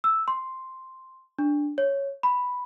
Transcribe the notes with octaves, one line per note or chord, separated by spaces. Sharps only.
E6
C6
D4
C#5
B5